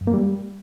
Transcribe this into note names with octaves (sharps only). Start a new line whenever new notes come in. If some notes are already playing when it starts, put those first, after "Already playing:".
F#2
A#3
G3